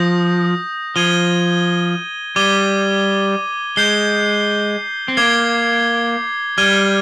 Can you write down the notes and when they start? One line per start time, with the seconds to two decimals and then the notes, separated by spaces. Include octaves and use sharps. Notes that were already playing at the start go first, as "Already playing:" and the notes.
Already playing: F3 D#6 G6 A#6
0.96 F3 G#6 D#7 G7
2.36 G3 D6 G#6 D#7 G7
3.76 G#3 G6 C7 G7
5.08 C4
5.17 A#3 D6 G#6 C7 G7
6.58 G3 F6 G#6 D#7 G7